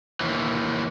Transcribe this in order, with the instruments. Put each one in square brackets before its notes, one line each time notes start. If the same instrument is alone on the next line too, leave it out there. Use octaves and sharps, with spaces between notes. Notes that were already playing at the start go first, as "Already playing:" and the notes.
[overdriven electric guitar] D#2 E3